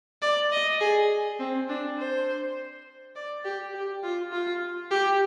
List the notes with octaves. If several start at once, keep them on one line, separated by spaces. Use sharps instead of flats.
D5
D#5
G#4
C4
D4
C5
D5
G4
G4
F4
F4
G4